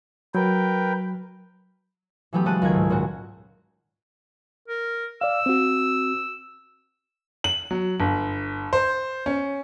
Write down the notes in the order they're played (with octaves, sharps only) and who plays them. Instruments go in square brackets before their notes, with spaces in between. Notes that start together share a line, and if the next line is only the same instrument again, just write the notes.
[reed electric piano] F#3 [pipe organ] A#4 B4 G5
[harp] E3 F#3 A3 B3 G4
C#3 G#3 F#4 A4 F#6 D#7
C#2 D#3 A3 G#4 A#4 G#6
G#2
A#2 C#3 G#3 F#4
[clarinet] A#4
[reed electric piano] D5 F5 [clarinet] E6
[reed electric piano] C4 F#4
[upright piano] F#7
F#3
G1
C5
C#4